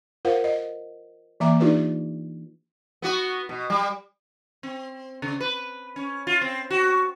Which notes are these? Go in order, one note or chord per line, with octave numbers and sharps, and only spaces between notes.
F4 A#4 C5 F5 F#5
D#5
E3 A#3 E5 A#5 D6
D4 D#4 F4 G4 B4 D5
B3 F#4
B2
G3
C4
C#3
B4
C#4
F4
C4
F#4